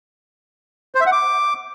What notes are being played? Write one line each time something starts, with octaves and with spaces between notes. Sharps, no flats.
C5
E5
F#5
D6